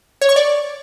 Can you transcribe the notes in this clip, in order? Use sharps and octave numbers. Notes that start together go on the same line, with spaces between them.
C#5
C#6
D5